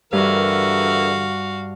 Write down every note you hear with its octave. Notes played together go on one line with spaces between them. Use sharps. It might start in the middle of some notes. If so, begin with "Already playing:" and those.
G2 D3 E3 F#4 A#4 F5